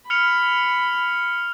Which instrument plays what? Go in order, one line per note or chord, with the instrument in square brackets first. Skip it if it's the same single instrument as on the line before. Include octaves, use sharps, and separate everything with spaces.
[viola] B5 [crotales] F6 C#7 F7